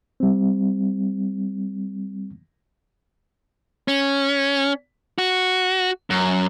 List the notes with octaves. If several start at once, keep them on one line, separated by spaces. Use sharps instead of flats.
G3 C4
C#4
F#4
F#2